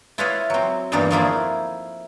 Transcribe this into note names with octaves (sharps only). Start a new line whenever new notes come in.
E4 F4 B4 C#5 D#5 F5
F#3 C4
E2 G2 E3 A#3 D4 D#4
F3 A3 A#3 D#4 E4 G#4